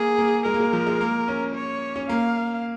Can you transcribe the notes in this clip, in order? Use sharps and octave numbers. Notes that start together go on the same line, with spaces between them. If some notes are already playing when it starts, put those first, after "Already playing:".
Already playing: A#3 G#4
A#3
G#3 A#4
A#3
G#3
F3
G#3
A#3
C#4
C#5
C#4
A#3 F5